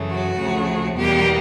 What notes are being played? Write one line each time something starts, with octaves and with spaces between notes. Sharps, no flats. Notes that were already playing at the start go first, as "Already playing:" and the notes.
Already playing: F#2 C#3 E3 A3
F#4
D2 C#3 F3 A3
E2 B2 G3 A#3 G4